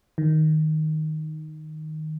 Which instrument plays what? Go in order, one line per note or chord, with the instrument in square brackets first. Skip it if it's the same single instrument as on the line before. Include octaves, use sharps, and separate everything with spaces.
[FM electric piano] D#3